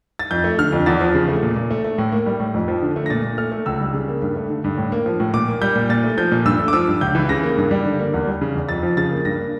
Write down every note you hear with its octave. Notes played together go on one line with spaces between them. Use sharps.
A6
F2 G6
A3
D3 F6
F2
E2 A6
F3
C#3
A3
A#2
A#2
A3
A3
A2
A#3
G3
A2
F2
F3
D3
A3
A#6
A#2 A6
A#2
A3 F6
A3
C#2 E6
G3
C#3
A#3
G2
A3
D3
G2
A2
A#3
F3
A2
A#2 D6
A#3
G3 G6
A#2
A#2 A6
A3
F3 G6
A#2
G2 E6
A3
D6
F3 E6
G2
C#2 G6
E3
C#3 A#6
A#3
G2
G3
D3
A#3
E2
G3
C#3
E2
F2 A6
F3
C#3 A6
A#3
G2 A#6
A#3